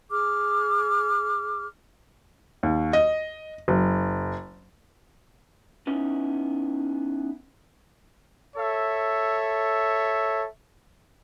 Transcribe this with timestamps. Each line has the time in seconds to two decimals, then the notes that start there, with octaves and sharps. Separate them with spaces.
0.10 G#4 D6 F6
2.63 D#2
2.93 D#5
3.68 F#1
5.87 B3 C#4 D#4 E4
8.56 A4 C#5 E5